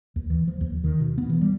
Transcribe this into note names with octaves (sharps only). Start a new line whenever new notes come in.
D#2
E3
F3
D#2
D#3
B2
B3
E3
G3